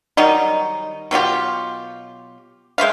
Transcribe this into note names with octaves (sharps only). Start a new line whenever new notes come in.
D#3 F#3 G3 D#4
B2 F#3 F4 G4
G#3 C5 E5 F5